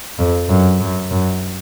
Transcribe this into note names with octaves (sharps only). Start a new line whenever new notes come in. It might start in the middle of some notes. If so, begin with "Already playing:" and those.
F2
F#2
F#2
F#2